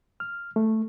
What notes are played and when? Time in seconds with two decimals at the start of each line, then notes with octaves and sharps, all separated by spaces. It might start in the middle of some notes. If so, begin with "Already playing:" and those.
0.20 F6
0.56 A3